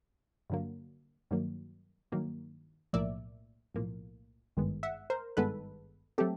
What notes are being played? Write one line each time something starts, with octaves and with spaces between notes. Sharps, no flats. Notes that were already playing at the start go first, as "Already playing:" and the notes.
G2 D3 F#3 A#3
G2 D#3 F#3 A#3
G2 D#3 F#3 A#3
B1 A2 F3 A#3 D5 E5
B1 A2 F3 A#3
G#1 G2 D#3 G#3 B3
E5 F#5
A#4 C5
G#1 G2 D#3 G#3 B3 A4 B4
F#3 A3 C4 G4 A4